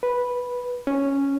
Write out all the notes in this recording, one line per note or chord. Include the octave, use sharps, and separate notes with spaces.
B4
C#4